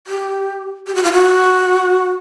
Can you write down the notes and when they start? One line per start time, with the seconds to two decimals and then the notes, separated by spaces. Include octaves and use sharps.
0.07 G4
0.87 G4
0.95 F#4
1.04 F4
1.12 F#4